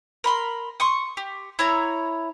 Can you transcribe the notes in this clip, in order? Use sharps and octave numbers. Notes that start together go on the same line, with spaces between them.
A#4 B5 C6
C6 C#6 D#6
G4
E4 C#5 A#5